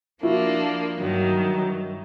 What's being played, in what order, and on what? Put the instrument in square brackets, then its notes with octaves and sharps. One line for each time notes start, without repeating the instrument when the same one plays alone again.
[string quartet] F3 A#3 D4 [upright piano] E4 F#4
[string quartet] G2 D#3 F#3